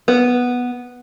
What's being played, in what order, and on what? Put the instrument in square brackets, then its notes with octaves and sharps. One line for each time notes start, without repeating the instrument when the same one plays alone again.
[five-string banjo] B3